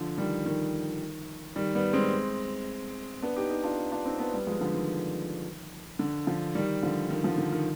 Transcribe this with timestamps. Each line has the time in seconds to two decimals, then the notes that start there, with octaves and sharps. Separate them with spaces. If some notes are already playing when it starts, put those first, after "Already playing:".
Already playing: D3 F3
0.18 D#3 G3
0.46 D#3
1.56 D#3 G3
1.75 G3 B3
1.93 G#3 C4
3.22 B3 D4
3.36 D#4 G4
3.50 D#4 G4
3.64 D4 F4
3.92 D4 F4
4.05 C4 D#4
4.19 B3 D4
4.34 G3 B3
4.47 F3 G#3
4.61 D3 F3
4.74 D#3
5.99 D3
6.27 D3 F3
6.55 D#3 G3
6.83 D3 F3
7.10 D#3
7.24 D3 F3
7.38 D3
7.52 D#3